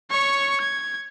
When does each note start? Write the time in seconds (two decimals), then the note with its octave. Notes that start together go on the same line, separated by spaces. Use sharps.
0.11 C#5 C#6
0.61 G#6